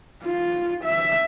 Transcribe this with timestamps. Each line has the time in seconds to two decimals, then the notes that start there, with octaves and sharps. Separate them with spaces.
0.23 F4
0.85 E5